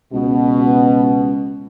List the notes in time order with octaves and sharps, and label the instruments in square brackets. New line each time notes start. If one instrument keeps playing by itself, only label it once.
[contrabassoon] C#2 [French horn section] B2